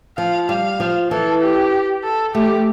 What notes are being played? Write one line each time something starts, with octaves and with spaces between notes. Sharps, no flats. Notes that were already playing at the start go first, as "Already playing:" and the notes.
F3 F5
G3 F5
F3
E3 A4
G4
A4
A3 G4